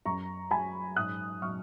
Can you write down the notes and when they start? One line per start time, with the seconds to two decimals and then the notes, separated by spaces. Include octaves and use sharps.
0.06 F#2 A#5 C#6
0.51 F#3 G#5 B5
0.96 G#2 D#6 F#6
1.42 F#3 C#6 F6